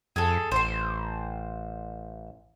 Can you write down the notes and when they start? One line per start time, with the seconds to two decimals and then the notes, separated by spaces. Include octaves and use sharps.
0.16 F2 G#4 A4
0.52 A1 C5 C6